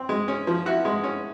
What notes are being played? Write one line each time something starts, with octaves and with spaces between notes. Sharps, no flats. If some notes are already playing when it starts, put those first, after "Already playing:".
Already playing: C4
G#3
C#4
F3
E4 F#4
G#3
C#4